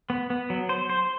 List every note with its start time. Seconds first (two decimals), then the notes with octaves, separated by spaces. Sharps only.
0.10 B3
0.30 B3
0.50 F#3
0.69 C5
0.90 C5